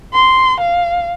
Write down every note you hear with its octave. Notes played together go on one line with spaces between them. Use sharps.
C6
F5